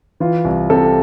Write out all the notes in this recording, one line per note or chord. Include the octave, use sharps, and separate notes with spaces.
E3 F4
C2
C3 A4